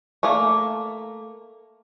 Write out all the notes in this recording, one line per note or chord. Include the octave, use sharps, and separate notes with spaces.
A3 A#3